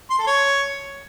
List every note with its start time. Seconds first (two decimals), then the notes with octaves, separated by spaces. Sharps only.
0.10 C6
0.19 A4
0.27 C#5